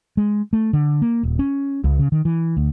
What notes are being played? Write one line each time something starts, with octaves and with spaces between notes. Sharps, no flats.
G#3
A3
D3
A#3
D#1
C#4
C#2
C#3
D#3
E3
D2